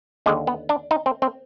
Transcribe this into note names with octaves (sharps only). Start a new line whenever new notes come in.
D#2 D3 G#3
B3
D4
D#4
C4
C4